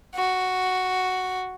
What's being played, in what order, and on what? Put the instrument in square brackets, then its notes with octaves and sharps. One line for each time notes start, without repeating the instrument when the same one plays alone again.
[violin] F#4